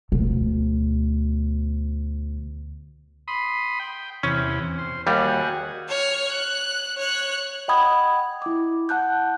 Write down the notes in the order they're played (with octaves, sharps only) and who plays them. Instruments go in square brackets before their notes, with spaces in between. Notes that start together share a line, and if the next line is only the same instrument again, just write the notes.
[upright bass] D2 B2
[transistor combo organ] B5 C6 D#6
G5
[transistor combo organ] E2 C3 [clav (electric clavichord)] C#4
[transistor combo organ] C5
[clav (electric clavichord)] D#2 G3 [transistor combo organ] F#4 G#4
[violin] C#5 F6
F#6
C#5 F#6
[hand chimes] D#5 F#5 G5 B5 D#6 G#6
E4 D6
F#5 A5 F#6 G6